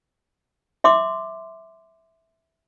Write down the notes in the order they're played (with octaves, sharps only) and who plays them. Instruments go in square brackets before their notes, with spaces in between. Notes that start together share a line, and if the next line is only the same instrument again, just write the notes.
[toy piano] E5 C6 D6